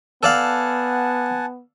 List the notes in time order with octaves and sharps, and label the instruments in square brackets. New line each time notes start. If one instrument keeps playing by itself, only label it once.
[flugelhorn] B3 [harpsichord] A4 D5 F5 [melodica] F#5 G#5 A5